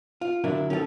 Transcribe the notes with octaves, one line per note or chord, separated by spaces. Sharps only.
F4
D3 F#3 D4 E4 A#4
C#4 D#4 G4 A4